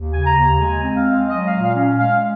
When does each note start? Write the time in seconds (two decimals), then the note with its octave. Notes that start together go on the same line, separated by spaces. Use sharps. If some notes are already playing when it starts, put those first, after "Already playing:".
Already playing: D#2
0.14 C#3 G#5
0.26 A#5
0.37 D#2
0.60 G#3 G#5
0.83 C4
0.95 F5
1.06 G#3
1.29 F#3 D#5
1.47 F5
1.52 A#2
1.63 F5
1.76 C#4
1.98 G#3 F5